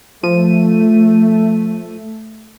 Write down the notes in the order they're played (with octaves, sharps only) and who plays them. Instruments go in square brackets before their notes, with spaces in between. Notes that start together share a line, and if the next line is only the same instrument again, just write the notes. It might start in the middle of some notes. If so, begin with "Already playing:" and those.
[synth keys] F3 D#7 [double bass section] A3